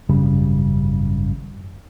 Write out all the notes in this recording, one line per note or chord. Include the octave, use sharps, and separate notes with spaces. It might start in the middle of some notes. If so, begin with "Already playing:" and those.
G#1 F#2 C#3 G3